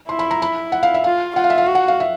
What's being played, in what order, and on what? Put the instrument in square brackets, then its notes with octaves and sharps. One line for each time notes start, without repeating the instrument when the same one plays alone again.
[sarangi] E4 [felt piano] C6
[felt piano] B5
A#5
B5
F#5
F5
E5
[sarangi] F4 [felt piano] F5
[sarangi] F4 [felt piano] F#5
[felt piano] F5
E5
F5
[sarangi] F#4
[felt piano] F#5
F5
E5